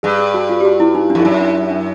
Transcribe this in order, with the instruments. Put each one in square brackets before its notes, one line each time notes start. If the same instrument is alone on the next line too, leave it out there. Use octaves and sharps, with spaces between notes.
[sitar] G2 [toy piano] G#4
[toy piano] G#4
F#4
F4
G4
F#4
E4
D#4
D4
[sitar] F2
[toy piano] E4
[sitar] F#2 [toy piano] D#4
[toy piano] D4
D4